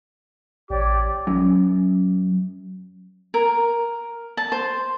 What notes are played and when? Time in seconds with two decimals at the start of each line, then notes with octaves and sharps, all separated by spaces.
0.70 A1 G4 C#5 D5 D6
1.27 F#2
3.34 A#4
4.37 A5
4.52 C5